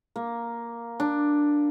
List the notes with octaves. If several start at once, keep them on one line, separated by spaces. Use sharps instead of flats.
A#3
D4